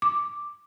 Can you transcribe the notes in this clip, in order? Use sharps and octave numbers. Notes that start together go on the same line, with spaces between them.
D6